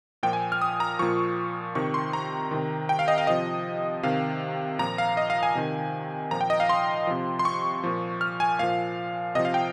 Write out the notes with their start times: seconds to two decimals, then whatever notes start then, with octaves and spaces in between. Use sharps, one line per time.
0.23 A#2 F3 G5
0.33 G#5
0.52 F6
0.62 D#6
0.80 A#5
0.99 A#2 F3 C#6
1.75 C3 D#3 C#6
1.94 C6
2.13 A#5
2.51 C3 D#3
2.89 G5
2.99 F5
3.08 D#5
3.18 F5
3.27 C3 F3 D#5
4.03 C3 D#3 F5
4.79 A#2 F3 A#5
4.98 F5
5.17 D#5
5.30 F5
5.43 G#5
5.55 C3 D#3
6.31 A#2 F3 A#5
6.41 G5
6.50 D#5
6.60 F5
6.69 C6
7.07 C3 F3
7.39 C6
7.45 C#6
7.83 A#2 F3
8.21 F6
8.40 G#5
8.59 A#2 F3 F5
9.35 C3 D#5
9.39 F3
9.45 F5
9.54 G5